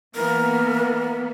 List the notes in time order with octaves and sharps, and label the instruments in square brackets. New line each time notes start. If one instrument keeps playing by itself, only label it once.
[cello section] E3 A#3 B3 [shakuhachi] A#4